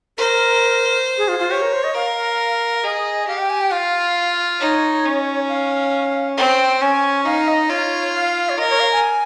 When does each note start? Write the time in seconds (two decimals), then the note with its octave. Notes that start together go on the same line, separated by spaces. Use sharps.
0.18 A#4 C5
1.18 G#4
1.28 F4
1.39 F4
1.50 G4 C#5
1.62 A#4
1.73 C5
1.84 D#5
1.95 A#4 F5
2.83 G#4 D#5
3.28 G4 F5
3.38 G5
3.50 G#5
3.61 G5
3.71 F4 F5
4.60 D#4 C#5
5.05 C#4
5.49 F5
6.37 C4 G5
6.81 C#4 G#5
7.25 D#4 F5
7.48 D#5
7.69 F4 C#5
8.15 F5
8.49 C#5
8.58 A#4 D#5
8.70 C#5
8.80 F5
8.92 G#5